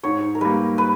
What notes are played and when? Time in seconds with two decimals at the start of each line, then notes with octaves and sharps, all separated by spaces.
0.03 G#2 C#5
0.35 A#4
0.41 G3 A#3 B4
0.78 B4